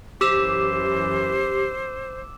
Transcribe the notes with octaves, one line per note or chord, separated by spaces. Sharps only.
F#2 E3 G4 C5 D6 E6 E7